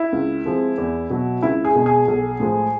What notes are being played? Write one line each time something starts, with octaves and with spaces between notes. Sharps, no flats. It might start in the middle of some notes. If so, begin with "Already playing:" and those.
Already playing: E4
C#2
C3 F3 G#3
E2
B2 F#3
C#2 E4
G#4
B2 G#3
G#4
B1
A2 F3 G#3